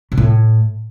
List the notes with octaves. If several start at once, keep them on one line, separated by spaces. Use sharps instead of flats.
B2
A2